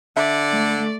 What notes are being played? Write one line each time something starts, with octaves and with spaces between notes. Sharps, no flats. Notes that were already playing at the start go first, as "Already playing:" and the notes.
D3 D5 E5
A3